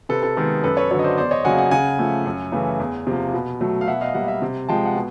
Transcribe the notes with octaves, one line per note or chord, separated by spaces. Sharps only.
C3 A4 B4
A4
D#3 G#3 B3 A4
F#2 A4 B4
B4 C#5
D3 F#3 B4 C#5
D#5
C5 D5
E2 C5 D5
C#5 D#5
C#3 F#3 A#3 F#5 G#5
F#5 G#5
C#3 F#5 G#5
F3 A3
F#2
C#3 E3 A3
E2
C3 F3 A#3
B2
F#3 A3
F5
B2 E5 F#5
D#5 F5
G3 A#3 E5 F#5
E5 F#5
C3
F3 G#3 G5 A5
F#5
B2